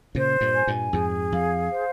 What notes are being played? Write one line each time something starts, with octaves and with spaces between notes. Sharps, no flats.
A#2 C#3 C5
G2 A#2
G#5
G2 A#2
F2 G#2 G#4
F2 F5
C5